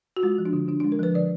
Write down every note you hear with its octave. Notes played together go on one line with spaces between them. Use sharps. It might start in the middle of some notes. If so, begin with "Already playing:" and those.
F#4
G#3 F4
F3
D4
D3
D3 D4
D4
G#3
A#4
F3 B4
D3 D5